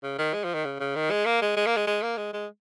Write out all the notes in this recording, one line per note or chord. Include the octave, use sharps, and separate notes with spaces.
C#3
D#3
G#3
F3
D#3
C#3
C#3
D#3
G#3
A#3
G#3
G#3
A#3
G#3
G#3
A#3
G#3
G#3